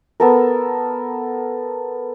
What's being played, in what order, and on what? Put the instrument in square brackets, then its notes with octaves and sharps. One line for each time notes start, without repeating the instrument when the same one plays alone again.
[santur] B3 A4 A#4